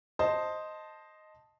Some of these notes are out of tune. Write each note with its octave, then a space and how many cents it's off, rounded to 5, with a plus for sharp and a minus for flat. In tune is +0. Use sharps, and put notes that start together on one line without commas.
C5 +0 D#5 +0 A5 +0